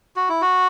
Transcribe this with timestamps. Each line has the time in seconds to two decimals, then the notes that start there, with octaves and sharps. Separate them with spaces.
0.16 F#4
0.29 E4
0.42 F#4